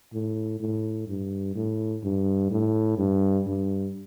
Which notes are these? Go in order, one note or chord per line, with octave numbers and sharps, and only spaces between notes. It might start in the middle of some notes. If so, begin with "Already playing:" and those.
A2
A2
G2
A2
G2
A2
G2
G2